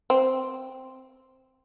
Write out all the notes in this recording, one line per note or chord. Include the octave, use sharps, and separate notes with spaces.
C4